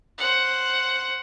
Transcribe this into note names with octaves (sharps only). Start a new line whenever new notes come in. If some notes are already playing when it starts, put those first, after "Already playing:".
C5 F#5